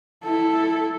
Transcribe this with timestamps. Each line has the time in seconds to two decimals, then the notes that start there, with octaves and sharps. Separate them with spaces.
0.24 E4 A4